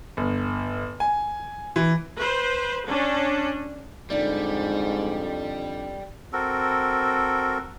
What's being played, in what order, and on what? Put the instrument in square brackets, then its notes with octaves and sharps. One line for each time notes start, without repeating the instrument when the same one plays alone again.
[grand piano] G1
G#5
E3
[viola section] B4 C5
C#4 D4
[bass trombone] F2 [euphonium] G#2 [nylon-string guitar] D3 D#4 D5 [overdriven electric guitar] G3
[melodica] C4 F#4 A4 A#4